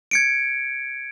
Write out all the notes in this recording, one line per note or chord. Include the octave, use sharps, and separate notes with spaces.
G#6 C#7 D7